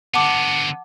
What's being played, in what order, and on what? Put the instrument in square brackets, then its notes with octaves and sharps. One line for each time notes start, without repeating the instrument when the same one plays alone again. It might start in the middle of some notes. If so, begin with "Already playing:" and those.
[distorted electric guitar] D3 B3 [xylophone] F#5 A5 D6